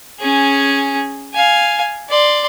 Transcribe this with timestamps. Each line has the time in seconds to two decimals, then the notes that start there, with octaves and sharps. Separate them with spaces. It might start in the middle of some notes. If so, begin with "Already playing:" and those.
0.20 C#4 G#4
1.34 F5 G#5
2.10 D5 C6